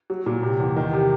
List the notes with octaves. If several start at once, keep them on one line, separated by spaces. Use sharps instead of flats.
F#3
A#2
C3
E2
D#3
C3